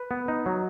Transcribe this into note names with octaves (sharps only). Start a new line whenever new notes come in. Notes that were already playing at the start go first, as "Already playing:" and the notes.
Already playing: B4
B3
D#4
F#3